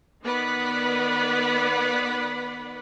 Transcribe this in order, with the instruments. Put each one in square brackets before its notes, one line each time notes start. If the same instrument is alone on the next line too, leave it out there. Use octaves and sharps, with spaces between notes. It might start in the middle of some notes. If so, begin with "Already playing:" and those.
[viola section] D#3 B3 B4 D5 F#5 B5